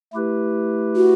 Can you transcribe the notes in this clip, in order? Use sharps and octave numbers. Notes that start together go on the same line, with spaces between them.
A3 E4 G4 B4
F#4